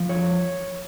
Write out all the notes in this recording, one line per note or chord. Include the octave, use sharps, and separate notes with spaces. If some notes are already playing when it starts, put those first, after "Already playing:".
Already playing: F3
F2 C#5